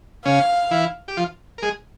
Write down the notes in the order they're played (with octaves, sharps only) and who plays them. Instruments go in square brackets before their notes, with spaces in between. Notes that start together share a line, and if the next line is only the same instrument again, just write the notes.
[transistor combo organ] C#3 C#4 [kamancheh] F5
[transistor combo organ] E3 E4
G4
F3 F4
A#4
G#3 G#4